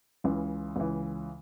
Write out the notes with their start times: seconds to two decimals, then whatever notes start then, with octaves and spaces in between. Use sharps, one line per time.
0.24 C#2 C#3 E3
0.76 C#2 C#3 E3